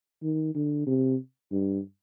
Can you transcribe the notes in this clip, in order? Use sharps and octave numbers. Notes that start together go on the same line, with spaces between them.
D#3
D3
C3
G2